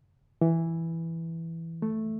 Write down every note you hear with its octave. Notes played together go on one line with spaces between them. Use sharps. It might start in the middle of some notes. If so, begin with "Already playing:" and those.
E3
A3